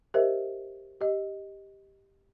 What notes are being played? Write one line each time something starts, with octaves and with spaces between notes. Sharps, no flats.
G4 A#4 C5 D#5 E5
G4 D#5